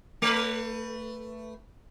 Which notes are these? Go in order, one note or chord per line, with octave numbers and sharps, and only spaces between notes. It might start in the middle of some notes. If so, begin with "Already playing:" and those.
A3 B4